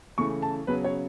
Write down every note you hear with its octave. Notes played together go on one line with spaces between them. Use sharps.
C#3 E3 A3 C#6
A5
C#3 F#3 B3 B4
C#5